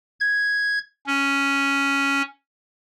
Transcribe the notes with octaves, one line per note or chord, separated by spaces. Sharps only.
G#6
C#4